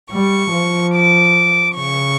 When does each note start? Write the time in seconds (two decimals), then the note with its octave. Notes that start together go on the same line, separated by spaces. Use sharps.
0.12 G3 C#6
0.52 F3
0.93 D6
1.75 C#3 C#6